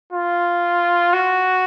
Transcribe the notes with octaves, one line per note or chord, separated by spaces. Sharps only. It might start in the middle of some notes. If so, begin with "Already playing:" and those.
F4
F#4